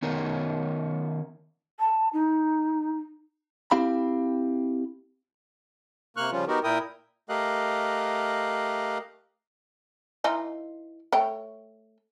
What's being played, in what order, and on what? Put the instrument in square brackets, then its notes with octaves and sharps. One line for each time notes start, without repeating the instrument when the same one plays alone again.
[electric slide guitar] D#3 B3 C#4 D#4 A#4
[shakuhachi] A5
D#4
[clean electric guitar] C4 E4 G4 F5 B5
[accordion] C3 A#3 C#6 F6 F#6
C#3 F3 G3 C#4 F4
B3 D#4 F#4 G4 A#4
A#2 E4 A#4 G5 D#6
[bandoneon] A3 G4 A#4 D#5 F5 F#6
[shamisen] E3 D#4 F4
A3 C#5 G5